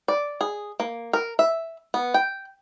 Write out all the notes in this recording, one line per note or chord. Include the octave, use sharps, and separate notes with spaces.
D5
G#4
A#3
A#4
E5
B3
G5